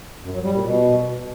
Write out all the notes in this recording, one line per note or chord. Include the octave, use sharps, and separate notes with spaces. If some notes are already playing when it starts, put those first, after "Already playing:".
F#2
F#3
G3
A#2
B2